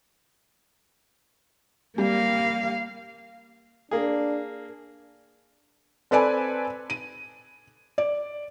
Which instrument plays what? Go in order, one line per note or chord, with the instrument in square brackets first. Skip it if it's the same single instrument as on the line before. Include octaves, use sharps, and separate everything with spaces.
[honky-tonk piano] G3 [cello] A#3 F5
[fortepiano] A#3 G#4 [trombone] D4
[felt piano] C4 A4 B4 D5 G#5 B5
D#7
D5